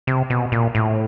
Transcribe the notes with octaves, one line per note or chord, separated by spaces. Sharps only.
C3
B2
A#2
A2